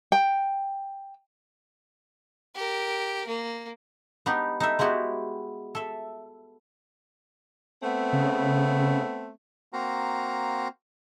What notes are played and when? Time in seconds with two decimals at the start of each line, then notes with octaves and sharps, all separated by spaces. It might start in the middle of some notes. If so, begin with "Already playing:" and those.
0.12 G5
2.55 G4 A#4
3.27 A#3
4.26 B3 D4 D#4 G4
4.60 D#4 A4 E5
4.79 G#3 B3 E4 F#4 G4
5.75 A4 E5
7.83 A3 B3 C4
8.13 C#3
9.73 A#3 C4 F#4 F5 A#5